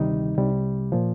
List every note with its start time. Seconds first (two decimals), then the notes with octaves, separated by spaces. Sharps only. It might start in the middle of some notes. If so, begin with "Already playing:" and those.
Already playing: D2 C3 D#3 G3 D#4
0.38 C2 C3 G3
0.92 A#2 F3